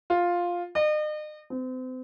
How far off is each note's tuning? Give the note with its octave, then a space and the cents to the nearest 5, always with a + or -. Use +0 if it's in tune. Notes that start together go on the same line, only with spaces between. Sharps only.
F4 +5
D#5 -40
C4 -35